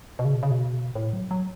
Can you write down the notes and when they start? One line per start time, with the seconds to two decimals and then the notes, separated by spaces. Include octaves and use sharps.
0.19 B2
0.25 C#3
0.34 B2
0.43 C#3
0.51 B2
0.95 A2
1.13 F#3
1.31 F#3